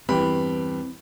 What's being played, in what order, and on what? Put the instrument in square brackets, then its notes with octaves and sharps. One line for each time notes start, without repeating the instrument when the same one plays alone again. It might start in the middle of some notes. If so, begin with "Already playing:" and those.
[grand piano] E2 G5 B5 [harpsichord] G2 [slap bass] C4